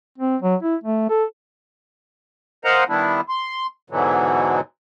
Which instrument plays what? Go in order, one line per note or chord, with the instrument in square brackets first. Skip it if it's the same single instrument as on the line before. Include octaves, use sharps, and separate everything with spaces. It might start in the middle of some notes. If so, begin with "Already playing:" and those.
[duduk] C4
F#3
E4
A3
A4
[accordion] A#4 C5 D#5 F5 F#5 A#5
D#3 G3 B3 D4 E4
C6
G#2 B2 D3 E3 F#3